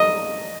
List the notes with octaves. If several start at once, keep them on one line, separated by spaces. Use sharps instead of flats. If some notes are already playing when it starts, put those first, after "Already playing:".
Already playing: D#5